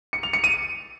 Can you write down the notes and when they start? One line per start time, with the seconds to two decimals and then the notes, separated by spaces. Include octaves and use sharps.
0.13 C#7
0.23 F7
0.33 C#7
0.44 D#7